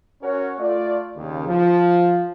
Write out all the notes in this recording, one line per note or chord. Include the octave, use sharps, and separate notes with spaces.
C#4 F#4 A#4 C#5
A3 F4 D5
D#2 C#3
F3